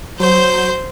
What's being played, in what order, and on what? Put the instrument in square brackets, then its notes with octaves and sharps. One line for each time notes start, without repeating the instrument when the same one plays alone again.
[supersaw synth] F#3 G6 [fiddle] C5